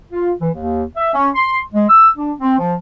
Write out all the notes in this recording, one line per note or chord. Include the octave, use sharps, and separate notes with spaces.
F4
E3
D#2
E5
C#4
C6
G#3
E6
D4
C4
F3